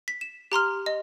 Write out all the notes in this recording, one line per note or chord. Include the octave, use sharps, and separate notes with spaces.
B6
E7
G4 A#5 C6 F6
D#5